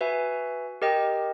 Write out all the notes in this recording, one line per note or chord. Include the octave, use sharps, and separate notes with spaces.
F#4 B4 E5 G#5
G4 A#4 D#5 G5